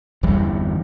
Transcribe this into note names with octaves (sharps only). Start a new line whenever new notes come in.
G1 E2 E3 G3